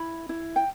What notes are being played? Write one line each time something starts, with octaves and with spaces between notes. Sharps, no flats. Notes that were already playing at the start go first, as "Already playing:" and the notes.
Already playing: E4 B5
E4
G5